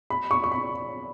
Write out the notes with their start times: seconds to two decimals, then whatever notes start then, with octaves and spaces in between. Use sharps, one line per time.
0.10 B5
0.31 C#6
0.44 C#6
0.52 B5